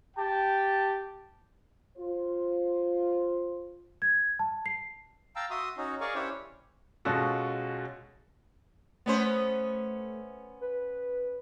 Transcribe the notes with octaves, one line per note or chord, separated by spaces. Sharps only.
G4 G5 A5
F4 C5
G#6
A5
C7
F5 G5 A5 A#5 E6
F#4 E5 C6 D#6
C#4 D#4 F#4
G#4 A#4 D5 F5 G#5 C#6
C#4 D4 E4 G4 C5 C#5
B2 G#3 C#4 F4 F#4 A4
A3 B3 C#4 C5
B4